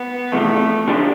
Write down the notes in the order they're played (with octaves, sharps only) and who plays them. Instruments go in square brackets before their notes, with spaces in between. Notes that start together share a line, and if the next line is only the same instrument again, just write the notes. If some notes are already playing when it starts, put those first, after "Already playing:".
Already playing: [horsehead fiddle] B3
[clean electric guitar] E2 C3 F3 [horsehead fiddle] A3
[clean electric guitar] D3 F3 A3 D4 G4